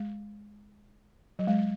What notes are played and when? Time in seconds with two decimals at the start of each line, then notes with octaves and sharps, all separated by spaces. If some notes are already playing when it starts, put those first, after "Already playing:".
Already playing: G#3
1.39 F#3
1.47 G#3